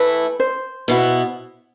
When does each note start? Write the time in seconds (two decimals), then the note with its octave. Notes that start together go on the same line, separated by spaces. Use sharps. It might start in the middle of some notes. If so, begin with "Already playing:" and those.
Already playing: E3 A3 E4 B4
0.40 C5
0.88 B2 B3 E4